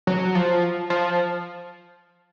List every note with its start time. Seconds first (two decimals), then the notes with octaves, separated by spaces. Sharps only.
0.07 F#3
0.35 F3
0.90 F3